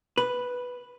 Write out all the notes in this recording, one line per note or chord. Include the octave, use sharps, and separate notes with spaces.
B4